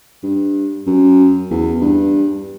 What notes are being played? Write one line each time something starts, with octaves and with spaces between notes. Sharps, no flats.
G2
F#2
E2
G2